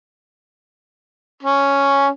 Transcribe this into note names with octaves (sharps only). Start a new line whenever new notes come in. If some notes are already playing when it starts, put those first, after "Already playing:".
C#4